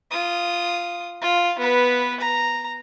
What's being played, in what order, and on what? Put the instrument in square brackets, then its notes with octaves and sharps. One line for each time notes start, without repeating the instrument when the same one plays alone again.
[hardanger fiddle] F4 D#6
F4
B3 B4
A#5